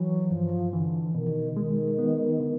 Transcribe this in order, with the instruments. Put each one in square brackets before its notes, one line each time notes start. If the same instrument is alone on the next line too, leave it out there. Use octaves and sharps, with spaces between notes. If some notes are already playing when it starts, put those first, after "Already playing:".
Already playing: [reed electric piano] E3 [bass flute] F#3
[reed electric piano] G2 [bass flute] F3
[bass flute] D3 [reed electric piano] E3
[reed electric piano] B2 [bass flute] D#3
[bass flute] D3
[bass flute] D#3 [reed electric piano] G#3
[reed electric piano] B3
D3